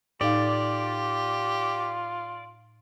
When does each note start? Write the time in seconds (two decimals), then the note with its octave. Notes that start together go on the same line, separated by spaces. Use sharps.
0.21 A2 D#4 F4 G4 D5 F5